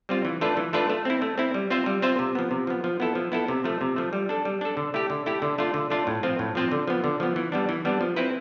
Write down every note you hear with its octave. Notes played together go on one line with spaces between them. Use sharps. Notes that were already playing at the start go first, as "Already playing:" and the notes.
G3 C4 F4
E3
A3 D4 F4 B4
E3
A3 D4 F4 B4
A3
C4 E4
A3
C4 E4
G3
C4 F4 C5 E5
G3
C4 F4 C5 E5
C3
F3 B3
C3
F3 B3
F3
B3 E4 A4
F3
B3 E4 A4
C3
F3 A3
C3
F3 A3
G3
D4 A4
G3
D4 A4
D3
A3 E4 G4
D3
A3 E4 G4
D3
A3 D4 F4
D3
A3 D4 F4
A2
F3 C4 F4
A2
F3 C4 F4
D3
F3 B3
D3
F3 B3
E3
G3 B3 D4
E3
G3 B3 D4
F3
C4 E4 B4